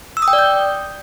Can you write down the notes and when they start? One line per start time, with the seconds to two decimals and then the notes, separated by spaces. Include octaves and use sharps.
0.17 E6
0.22 D#6
0.28 G5
0.33 D5
0.39 G6